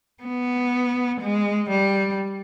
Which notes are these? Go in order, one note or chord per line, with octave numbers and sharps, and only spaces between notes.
B3
G#3
G3